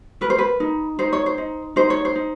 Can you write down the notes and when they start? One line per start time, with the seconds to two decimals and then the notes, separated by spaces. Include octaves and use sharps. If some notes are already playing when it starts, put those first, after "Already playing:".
0.21 A#4 B4
0.30 C5
0.39 B4
0.60 D#4
0.99 D#4 C5
1.13 C#5
1.26 C5
1.38 D#4
1.76 D#4 C5
1.90 C#5
2.05 C5
2.15 D#4